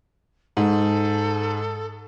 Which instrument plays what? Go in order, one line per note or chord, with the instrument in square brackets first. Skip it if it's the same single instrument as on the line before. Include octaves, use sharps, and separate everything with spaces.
[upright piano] G#2 [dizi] A4